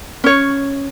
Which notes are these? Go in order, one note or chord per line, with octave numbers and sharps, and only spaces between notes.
C#4 C#5